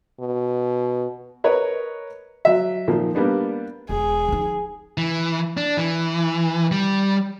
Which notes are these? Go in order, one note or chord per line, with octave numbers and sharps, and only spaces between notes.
B2
A#4 B4 C#5 D#5
F#3 E5
A#2 D#3 F3
G3 A#3 B3 D4
E1 G#4
F3 D#4
E3
D4
E3
G3